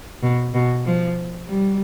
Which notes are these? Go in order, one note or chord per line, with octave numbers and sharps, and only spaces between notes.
B2
B2
F3
G3